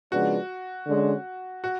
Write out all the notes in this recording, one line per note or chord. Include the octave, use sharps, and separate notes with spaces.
C#3 F3 G#3 B3 D4 F#4
D3 G#3 C#4
F#4